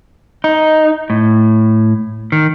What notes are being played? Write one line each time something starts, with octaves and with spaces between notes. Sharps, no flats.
D#4
A2
D#3